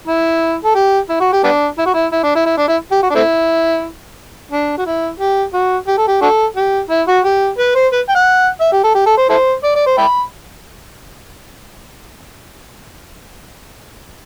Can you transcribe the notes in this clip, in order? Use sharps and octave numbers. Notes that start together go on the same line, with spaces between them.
E4
A4
G4
E4
F#4
G4
G3 B3 D4
E4
F#4
E4
E4
D4
E4
E4
D4
E4
G4
F#4
D4
A3 C4 E4
D4
F#4
E4
G4
F#4
G4
A4
G4
D4 F#4 A4
G4
E4
F#4
G4
B4
C5
B4
G5
F#5
E5
G4
A4
G4
A4
C5
E4 A4 C5
D5
D5
C5
E5 G5 B5